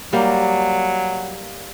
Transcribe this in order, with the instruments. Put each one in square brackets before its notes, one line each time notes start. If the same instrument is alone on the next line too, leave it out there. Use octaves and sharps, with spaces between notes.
[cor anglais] F#3 [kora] G3 A#3